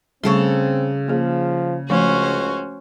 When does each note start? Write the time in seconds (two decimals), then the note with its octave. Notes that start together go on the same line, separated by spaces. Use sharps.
0.23 C#3 G3 A3 C4 A4 C6 C#6
1.08 F3 A#3 G#4
1.90 C#2 F3 A3 C#4 D4 F#4 C5